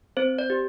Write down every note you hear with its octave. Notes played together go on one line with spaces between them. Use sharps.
C4 C5
D5
G4